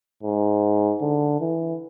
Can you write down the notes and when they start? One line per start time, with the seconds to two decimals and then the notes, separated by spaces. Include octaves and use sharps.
0.23 G#2
1.02 D3
1.41 E3